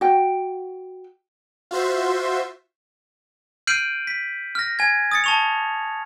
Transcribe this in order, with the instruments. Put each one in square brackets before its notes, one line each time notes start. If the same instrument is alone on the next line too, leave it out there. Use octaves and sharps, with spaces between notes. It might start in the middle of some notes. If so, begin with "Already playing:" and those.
[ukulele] F#4 G5
[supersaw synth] F4 F#4 C5 E5
[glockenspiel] F6 G6 C7 D7 D#7 F#7
B6
F6 A#6
G#5 G#6
D#6 A6 C#7
A5 C#6 F7